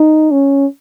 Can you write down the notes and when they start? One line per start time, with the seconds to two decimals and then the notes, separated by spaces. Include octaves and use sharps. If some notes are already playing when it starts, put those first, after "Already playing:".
Already playing: D#4
0.32 C#4